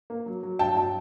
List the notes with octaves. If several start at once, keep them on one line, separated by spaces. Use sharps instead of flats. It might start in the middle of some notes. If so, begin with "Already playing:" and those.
A#3
F#3
F#3
G2 G5 A5
F#3 G5 A5